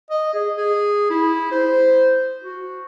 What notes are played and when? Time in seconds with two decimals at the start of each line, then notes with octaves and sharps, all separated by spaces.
0.10 D#5
0.33 G#4
0.57 G#4
1.10 E4
1.52 C5
2.43 F#4